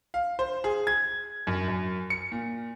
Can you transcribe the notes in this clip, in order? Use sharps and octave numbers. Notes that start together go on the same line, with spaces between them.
F5
C5
G#4
G#6
F#2
F#2
C#7
A#2